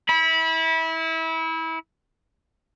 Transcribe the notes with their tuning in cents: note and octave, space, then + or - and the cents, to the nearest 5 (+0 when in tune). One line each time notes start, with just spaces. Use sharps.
E4 -25 B5 -25